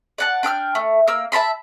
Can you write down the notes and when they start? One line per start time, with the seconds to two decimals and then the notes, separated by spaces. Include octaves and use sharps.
0.18 D5 F#5 A5
0.43 D4 G5 E6 F6
0.75 A3
1.08 A#3 E6
1.32 E5 A5 B5 C6